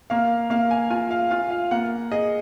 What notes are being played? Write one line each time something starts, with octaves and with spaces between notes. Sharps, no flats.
A#3 F5
A#3 F5
G#5
F4 G#5
F5
F4 F5
F5
A#3 F#5
G#4 D#5